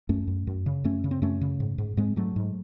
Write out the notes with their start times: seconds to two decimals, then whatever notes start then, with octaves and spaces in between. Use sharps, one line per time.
0.09 F#2 A3 C#4
0.27 F#2
0.47 F#2
0.66 C#3
0.84 F#2 A3 C#4
1.04 C#3
1.11 C4
1.22 F#2 A3 C#4
1.41 C#3
1.60 G#2
1.78 G#2
1.97 G#2 G#3 C4
2.16 G#2 F#3 A3
2.36 G#2